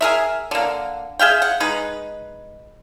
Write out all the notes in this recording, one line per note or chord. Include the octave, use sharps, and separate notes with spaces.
G#4 A#4 E5
D3 A#3
G#4 E5 F5 G5
F#5
G#3 D#4 B4